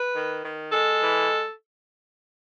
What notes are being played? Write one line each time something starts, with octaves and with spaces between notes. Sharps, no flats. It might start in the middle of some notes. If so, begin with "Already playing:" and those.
Already playing: B4
D#3
D#3
G#3 A4
E3